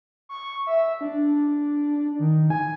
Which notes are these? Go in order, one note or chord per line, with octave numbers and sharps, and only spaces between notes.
C#6
E5
D4
D#3
G#5